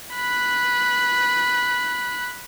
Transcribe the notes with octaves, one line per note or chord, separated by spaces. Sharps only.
B5 F#6